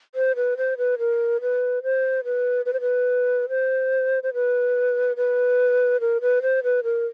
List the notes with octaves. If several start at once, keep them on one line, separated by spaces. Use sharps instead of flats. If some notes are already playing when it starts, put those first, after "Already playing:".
C5
B4
C5
B4
A#4
B4
C5
B4
B4
C5
B4
C5
C5
B4
B4
A#4
B4
C5
B4
A#4